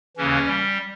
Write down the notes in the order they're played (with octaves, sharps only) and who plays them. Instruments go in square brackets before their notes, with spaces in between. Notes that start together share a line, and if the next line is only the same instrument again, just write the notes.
[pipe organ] D#2 C#3 E3 C#4
G3